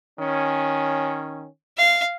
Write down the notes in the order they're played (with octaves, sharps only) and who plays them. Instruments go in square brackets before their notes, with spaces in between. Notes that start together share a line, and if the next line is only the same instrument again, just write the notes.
[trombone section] D#3 C#4
[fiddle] F5